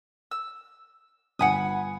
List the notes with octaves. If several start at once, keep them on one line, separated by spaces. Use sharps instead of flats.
E6
G1 F#5 G#5 B5 D#6 C#7